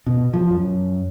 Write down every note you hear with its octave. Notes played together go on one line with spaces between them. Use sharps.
B2
F3
F#2